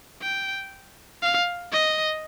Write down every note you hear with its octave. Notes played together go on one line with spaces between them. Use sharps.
G5
F5
D#5